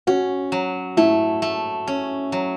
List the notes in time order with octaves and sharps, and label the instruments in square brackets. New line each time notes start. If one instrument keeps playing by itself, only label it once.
[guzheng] C#4 [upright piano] F#4
[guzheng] F#3
[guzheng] A3 [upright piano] E4
[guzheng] A3
C#4
F#3